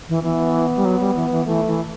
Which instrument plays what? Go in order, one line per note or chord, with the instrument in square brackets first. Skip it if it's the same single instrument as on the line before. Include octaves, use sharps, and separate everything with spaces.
[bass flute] E3
[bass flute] E3 [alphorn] B3
[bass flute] G3
F#3
G3
E3
E3
[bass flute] E3 [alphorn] A3
[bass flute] E3